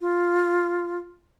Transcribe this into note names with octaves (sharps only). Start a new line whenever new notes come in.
F4